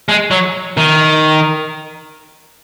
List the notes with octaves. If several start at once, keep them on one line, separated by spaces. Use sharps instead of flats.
G#3
F#3
D#3